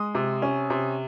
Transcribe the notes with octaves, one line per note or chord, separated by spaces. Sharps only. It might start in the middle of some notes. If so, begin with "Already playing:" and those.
Already playing: G#3 D#6
C3
C#4
C3